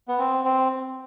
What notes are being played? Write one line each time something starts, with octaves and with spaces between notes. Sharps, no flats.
B3
C4
C4